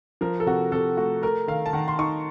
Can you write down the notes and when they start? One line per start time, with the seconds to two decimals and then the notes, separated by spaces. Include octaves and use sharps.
0.21 F3 A#4
0.40 A4
0.46 C3 F#4
0.72 C3 A4
0.97 A3 F#4
1.22 A3 A#4
1.48 D#3 F5
1.66 A5
1.73 D#3 F#5
1.88 C6
1.99 D#4 C#6